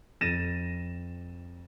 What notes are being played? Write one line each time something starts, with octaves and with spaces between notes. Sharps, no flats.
F2 A6 A#6 D#7 E7